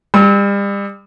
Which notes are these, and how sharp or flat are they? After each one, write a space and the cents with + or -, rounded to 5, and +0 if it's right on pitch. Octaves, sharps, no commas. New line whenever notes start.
G3 +35 E6 -35